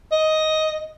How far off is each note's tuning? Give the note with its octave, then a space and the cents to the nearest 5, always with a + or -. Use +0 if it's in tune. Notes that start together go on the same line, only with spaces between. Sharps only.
D#5 +5